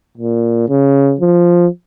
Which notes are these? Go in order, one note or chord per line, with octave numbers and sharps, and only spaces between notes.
A#2
C#3
F3